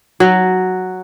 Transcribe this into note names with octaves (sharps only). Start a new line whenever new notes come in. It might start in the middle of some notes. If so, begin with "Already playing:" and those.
F#3